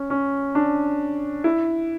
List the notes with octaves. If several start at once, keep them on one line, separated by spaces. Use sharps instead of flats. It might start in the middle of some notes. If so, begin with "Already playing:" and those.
Already playing: C#4
C#4
D4
E4